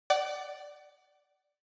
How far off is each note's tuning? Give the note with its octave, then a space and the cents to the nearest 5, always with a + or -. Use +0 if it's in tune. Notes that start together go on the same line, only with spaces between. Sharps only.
D5 +0 F#5 +35